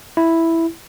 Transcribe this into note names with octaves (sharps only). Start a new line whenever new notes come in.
E4